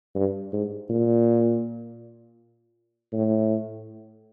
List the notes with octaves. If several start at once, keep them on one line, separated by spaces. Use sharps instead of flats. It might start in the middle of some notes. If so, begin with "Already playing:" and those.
G2
G#2
A#2
A2